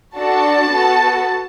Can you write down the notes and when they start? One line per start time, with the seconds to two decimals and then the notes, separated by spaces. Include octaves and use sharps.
0.17 D4 F#4 A4 A5
0.70 B3 F#4 A4